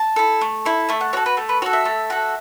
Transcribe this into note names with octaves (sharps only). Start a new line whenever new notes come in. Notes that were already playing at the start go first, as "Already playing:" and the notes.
Already playing: A5
E4 A4
A3
E4 A4
A3 E5
F#5
F#4 A4 C#5
B4
A3
B4
F#4 A4 C#5
E5
A3
F#4 A4